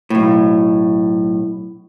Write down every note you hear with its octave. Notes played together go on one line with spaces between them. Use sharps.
B1 A2